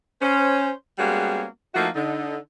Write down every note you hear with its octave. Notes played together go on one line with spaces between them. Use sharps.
C#4 C5
G3 G#3 A#3 B3 C#4 F#4
F3 A3 A#3 D#4 E4 F#4
D3 D#4